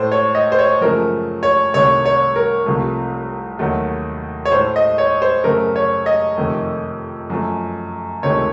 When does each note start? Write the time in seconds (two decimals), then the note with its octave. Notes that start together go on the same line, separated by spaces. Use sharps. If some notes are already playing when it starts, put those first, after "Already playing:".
Already playing: A2 A3 C5
0.12 C#5
0.35 D#5
0.52 C5
0.59 C#5
0.81 F#2 C#3 F3 A3 A#4
1.43 C#5
1.74 C2 C3 D#3 A3 C#5
2.06 C#5
2.36 A#4
2.66 C2 C3 F3 A3
3.59 D#2 D#3 F#3 A3
4.45 C#5
4.51 A2 A3 C5
4.76 D#5
4.98 C#5
5.22 C5
5.44 F#2 C#3 A3 A#4
5.76 C#5
6.06 D#5
6.37 F2 C3 D#3 A3
7.30 F#2 F3 A3
8.22 C#2 C3 D#3 A3 C#5